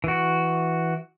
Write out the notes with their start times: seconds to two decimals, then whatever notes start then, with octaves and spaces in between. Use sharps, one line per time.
0.04 E3 F#4